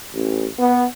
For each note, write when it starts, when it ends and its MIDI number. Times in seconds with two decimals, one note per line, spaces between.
0.13 0.45 33
0.58 0.83 59